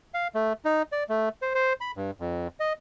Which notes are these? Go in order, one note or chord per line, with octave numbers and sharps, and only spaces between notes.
F5
A3
D#4
D5
A3
C5
C5
B5
G2
F2
D#5